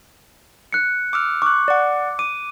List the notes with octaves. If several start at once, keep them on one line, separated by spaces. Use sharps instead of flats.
F#6 C#7
D6 E6 F6
C#6 D6 F#6
D5 F#5
D6 D#7